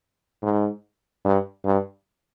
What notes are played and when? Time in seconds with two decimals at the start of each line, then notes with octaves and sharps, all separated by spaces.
0.43 G#2
1.25 G2
1.65 G2